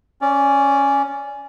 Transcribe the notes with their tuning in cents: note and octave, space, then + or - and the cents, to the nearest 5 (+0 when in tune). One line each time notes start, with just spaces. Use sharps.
C#4 +0 D5 -20